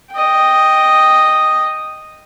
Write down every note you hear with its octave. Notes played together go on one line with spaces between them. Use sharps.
D#5 G5